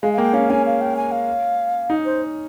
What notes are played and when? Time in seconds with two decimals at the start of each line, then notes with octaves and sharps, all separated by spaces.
0.03 G#3 F5
0.13 F5
0.18 A#3 G5
0.33 C#4 F5
0.50 C#4 G#5
0.65 F5
0.81 G5
0.97 G#5
1.11 F5
1.90 D#4
2.05 C5